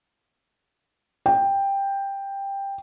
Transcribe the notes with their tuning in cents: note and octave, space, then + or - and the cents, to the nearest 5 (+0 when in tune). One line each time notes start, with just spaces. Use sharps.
G5 +10